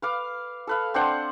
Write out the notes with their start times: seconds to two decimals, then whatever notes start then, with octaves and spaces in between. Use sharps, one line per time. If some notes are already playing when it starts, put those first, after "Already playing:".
0.02 B4 F5 D6
0.67 A4 B4 F5
0.94 C4 D4 C5 F#5